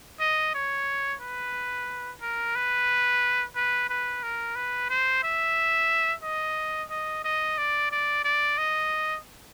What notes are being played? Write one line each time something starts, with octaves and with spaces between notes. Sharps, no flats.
D#5
C#5
B4
A#4
B4
B4
B4
A#4
B4
C5
E5
D#5
D#5
D#5
D5
D5
D5
D#5